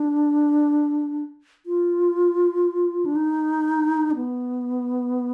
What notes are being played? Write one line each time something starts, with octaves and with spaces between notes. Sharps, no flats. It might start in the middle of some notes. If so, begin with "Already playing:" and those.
Already playing: D4
F4
D4
D#4
D4
B3